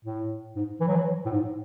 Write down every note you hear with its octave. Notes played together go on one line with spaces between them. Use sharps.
A2
G#2
E3
F#3
E3
A2
G#2